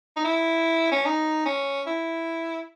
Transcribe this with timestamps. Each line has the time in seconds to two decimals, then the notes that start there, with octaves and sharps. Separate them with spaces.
0.16 D#4
0.24 E4
0.92 C#4
1.06 D#4
1.45 C#4
1.86 E4